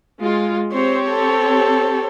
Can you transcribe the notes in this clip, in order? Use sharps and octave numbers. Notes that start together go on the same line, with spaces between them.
G#3 F4
C4 G4 C5 C#5
A4